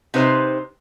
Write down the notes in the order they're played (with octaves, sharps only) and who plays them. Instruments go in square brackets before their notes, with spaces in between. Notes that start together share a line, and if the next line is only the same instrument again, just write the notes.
[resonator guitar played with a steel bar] C3 D#4 B4 C5